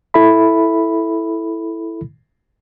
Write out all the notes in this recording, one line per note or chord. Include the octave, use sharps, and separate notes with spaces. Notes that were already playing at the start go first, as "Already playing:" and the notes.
E4 A4 E5 B5